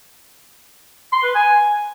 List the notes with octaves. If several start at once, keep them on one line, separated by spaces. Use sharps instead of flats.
C6
B4
G#5